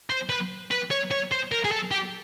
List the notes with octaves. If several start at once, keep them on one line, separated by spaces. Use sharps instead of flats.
C5
B4
B4
C#5
C#5
C5
A#4
G#4
A4
G4